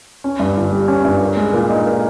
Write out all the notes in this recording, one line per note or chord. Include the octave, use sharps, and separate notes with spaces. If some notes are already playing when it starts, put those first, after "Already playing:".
C#4
G2
G1
G3
C#4
G2
A#4
G#3
A#2
D#4
A#4